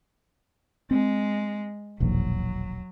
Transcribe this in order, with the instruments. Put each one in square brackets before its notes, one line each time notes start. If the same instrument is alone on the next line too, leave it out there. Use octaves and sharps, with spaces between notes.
[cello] G#3 [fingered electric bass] C4
[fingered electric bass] E1 A#1 D#2 [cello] F#3